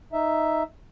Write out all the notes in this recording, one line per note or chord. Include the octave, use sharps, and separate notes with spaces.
D#4 E5